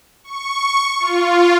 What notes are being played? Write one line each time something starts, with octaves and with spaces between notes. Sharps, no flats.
C#6
F4